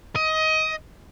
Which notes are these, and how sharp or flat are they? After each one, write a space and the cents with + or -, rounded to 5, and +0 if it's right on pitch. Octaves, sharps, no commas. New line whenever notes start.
D#5 +20